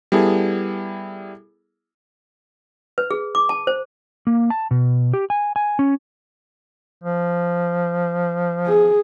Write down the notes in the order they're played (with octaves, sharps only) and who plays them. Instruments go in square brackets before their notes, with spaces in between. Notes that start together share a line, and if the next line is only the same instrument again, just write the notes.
[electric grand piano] G3 B3 E4 G#4 A4
[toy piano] B4
G#4
D6
A5
C5
[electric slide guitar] A#3
A5
B2
G4
G#5
G#5
C#4
[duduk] F3
[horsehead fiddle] G#4